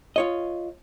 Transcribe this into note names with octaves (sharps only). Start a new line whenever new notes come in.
F4 C#5 D#5